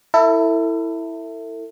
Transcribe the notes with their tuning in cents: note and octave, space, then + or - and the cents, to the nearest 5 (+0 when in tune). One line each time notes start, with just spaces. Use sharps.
E4 +0 A4 +35